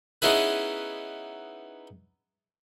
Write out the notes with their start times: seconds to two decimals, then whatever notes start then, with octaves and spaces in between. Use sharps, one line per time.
0.22 B3 C#4 D#4 E4 G#4 B4